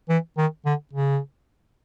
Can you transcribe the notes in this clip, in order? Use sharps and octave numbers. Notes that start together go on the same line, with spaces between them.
E3
D#3
D3
C#3